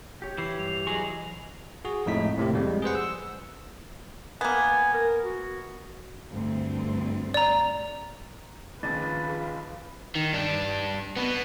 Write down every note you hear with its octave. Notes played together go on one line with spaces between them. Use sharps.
G4 C#5
E3 C7
G2 F7
F#3 G#4 D#5 C#6
F#4 G#4
F2 A2 G#3 D#4 E4 B6
A2 C3 A#3 G4
F2 G3 G#3
G#4 B4 C5 F#5
E6
A#3 B3 G#5
A#4
F#4
D2 G2 C4
D5 A#5
A#1 D#2 C#3 F4 B4 A6
G#4
D#3
G2 D4
B2 B3